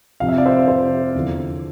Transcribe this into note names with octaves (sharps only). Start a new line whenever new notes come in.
F2 C3 F3 F5
E5
D5
C5 E5
F2 C3 F3 C5
E2 D3 F3